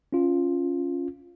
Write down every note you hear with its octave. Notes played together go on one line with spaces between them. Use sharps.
C#4 F4